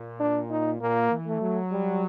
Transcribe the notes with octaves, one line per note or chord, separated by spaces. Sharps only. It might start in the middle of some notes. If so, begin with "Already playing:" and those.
Already playing: A#2
D4
D#4
A#2 A#3
E3
A3
F#3
G3